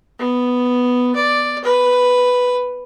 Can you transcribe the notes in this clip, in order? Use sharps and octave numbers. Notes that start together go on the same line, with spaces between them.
B3
D5
B4